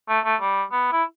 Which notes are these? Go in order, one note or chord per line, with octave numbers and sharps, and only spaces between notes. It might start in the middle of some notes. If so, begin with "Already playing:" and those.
A3
A3
G3
B3
E4